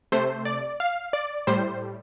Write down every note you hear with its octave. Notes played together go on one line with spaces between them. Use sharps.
C3 A3 C5
D5
F5
D5
A2 G3 C5